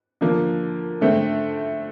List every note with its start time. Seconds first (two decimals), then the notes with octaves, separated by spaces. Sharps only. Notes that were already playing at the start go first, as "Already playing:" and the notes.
0.21 D3 F3 A#3
1.01 D3 A3 C4